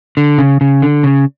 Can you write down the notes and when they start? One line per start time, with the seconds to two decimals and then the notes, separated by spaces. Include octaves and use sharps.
0.17 D3
0.38 C#3
0.61 C#3
0.82 D3
1.03 C#3